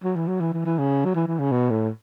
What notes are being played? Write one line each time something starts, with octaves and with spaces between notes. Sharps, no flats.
F#3
E3
F#3
E3
E3
E3
C#3
F#3
E3
E3
C#3
B2
A2